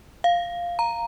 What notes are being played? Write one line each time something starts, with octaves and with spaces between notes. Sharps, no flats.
F5
A#5